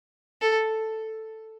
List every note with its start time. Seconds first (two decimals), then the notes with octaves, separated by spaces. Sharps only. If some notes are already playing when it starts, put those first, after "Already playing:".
0.41 A4